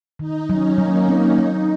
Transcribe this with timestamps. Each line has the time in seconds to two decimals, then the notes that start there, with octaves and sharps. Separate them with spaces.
0.19 D#3 D#4
0.49 F#3 C#4
0.78 F#3 A#3
1.08 C4 C#4
1.38 F#3 D#4